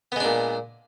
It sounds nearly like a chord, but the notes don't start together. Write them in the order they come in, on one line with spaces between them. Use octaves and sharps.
B3 G#3 D4 A#2